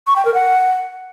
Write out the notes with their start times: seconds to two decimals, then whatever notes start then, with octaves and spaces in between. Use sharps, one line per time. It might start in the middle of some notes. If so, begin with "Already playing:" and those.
0.07 C#6
0.16 G5
0.25 A#4
0.34 F#5